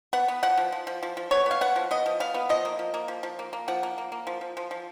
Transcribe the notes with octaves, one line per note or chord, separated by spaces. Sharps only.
B3 F#5
B3
F3 F#5
F3
F3
F3
F3
F3
B3 C#5
B3 F5
B3 F#5
F3
B3 D#5
F3
B3 F5
B3
F3 D#5
A#3
F3
A#3
F3
F3
A#3
A#3
F3 F#5
A#3
A#3
A#3
F3
F3
F3
F3